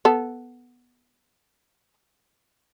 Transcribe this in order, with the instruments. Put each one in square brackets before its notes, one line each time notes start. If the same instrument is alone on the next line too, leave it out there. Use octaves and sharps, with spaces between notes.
[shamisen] B3 A4